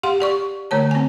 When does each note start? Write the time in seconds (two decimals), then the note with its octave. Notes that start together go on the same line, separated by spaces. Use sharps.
0.03 G4 F5 F#5 C6
0.20 G4 D5 C#6
0.71 D3 A3 C#5 A5
0.91 C4 G#5